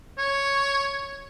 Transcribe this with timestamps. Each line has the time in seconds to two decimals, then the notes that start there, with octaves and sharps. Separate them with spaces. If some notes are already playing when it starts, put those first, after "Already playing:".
0.18 C#5